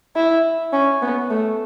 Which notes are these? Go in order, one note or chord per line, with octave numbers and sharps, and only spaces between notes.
E4
C#4
B3
A3